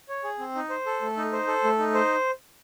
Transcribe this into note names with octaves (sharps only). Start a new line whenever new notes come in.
C#5
G#4
C4
D#4
C5
A4
A3
D#4
C5
A4
A3
D#4
C5